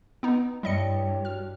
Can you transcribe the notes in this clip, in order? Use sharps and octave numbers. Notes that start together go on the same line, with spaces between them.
B3 D#4
G2 G3 E4 C#5 D#5 G5 C#7
F#4 F6